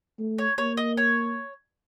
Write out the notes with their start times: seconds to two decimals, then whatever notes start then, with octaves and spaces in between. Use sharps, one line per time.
0.19 A3
0.38 C#5
0.58 A#3 C#5
0.77 D#5
0.97 C#5